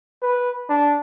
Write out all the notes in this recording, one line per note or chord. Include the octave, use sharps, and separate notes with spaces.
B4
D4